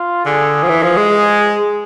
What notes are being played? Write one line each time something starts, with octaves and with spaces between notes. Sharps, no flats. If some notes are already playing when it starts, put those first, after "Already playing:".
Already playing: F4
D3 G#4
F3
E3
F3
G#3
G#4